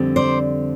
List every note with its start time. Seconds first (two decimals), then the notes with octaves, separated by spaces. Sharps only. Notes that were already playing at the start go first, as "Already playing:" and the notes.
Already playing: F2 D3 G3 C4
0.16 C5 D5